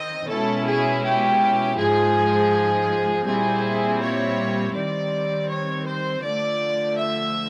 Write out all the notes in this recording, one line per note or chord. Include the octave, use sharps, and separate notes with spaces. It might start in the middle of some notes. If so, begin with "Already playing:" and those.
Already playing: D#3 C4 D#5
B2 G#3 C#4 E4 A4
G#4
G4
G#2 F3 G#3 G#4
A#2 G3 C4 E4 G#4
C#5
D#3 G3 C4 D5
C#5
C5
D3 F3 A3 D5
E5